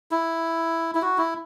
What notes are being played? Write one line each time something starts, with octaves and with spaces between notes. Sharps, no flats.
E4
E4
F#4
E4